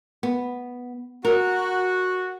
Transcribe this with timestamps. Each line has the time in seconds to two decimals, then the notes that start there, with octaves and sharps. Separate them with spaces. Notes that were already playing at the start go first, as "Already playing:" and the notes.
0.23 B3
1.25 F#4 A#4